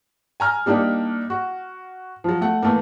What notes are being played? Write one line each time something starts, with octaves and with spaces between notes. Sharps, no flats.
G#5 A#5 F6
G3 A#3 D4 D#4 G4
F#4
F3 F#3
A3 F#5
E3 A3 A#3